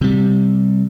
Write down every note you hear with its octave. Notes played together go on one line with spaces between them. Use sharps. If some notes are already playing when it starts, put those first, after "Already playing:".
C3 G3